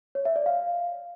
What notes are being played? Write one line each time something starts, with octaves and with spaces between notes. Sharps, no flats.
C#5
E5
D5
F5